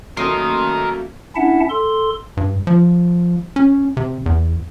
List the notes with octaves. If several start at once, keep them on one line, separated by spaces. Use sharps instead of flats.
F#3 A3 A#3 C#4 A#4 D#5 C6 D#6
C#4 D4 E4 E5 F#5 A5
A4 C6
G2
F3
C#4
C3
E2